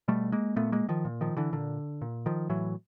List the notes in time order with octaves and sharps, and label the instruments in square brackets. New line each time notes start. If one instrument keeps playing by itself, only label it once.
[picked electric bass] B2 G3 A3
G#3 A#3
A#2 A3 B3
G#3 A#3
D#3 F3
A#2
D#3 F3
D3 E3
A#2 D3
A#2
D#3 F3
A2 E3 F#3